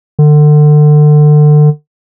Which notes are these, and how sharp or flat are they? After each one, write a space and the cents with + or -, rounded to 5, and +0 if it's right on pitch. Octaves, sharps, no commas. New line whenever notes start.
D3 +30